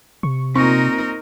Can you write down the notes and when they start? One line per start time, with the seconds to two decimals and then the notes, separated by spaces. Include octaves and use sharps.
0.23 C3 C#6
0.56 A#2 C4 D#4 A#4 C#6